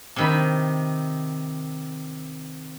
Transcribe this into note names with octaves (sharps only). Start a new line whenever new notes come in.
C3 D#3 B5